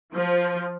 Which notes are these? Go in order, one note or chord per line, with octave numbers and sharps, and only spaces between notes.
F3